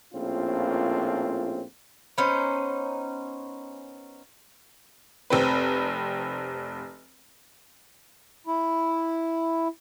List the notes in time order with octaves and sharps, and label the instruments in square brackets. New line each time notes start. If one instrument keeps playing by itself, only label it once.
[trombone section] A#1 A2 A#3 C4 C#4 F4
[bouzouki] B3 C#4 D#4 C5
[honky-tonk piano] F1 C4 B4
[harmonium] E4